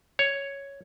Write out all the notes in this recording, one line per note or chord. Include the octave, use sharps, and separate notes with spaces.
C#5